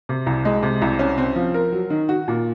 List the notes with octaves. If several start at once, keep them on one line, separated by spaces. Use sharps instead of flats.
C3
C2
G#3
C3
C2
C#4
C4
F3
A#4
F#3
D#3
F#4
A#2